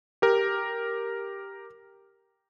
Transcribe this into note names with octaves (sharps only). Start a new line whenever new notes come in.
G4 A#4